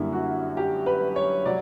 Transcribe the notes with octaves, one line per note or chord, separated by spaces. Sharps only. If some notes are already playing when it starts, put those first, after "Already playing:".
Already playing: F#2 D3 G3 A#3 E4
F#4
G4
B4
C#5
F#3 D5